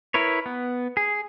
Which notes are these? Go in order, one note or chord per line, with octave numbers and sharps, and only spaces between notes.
E4 A#4 B4 C#5
B3
G#4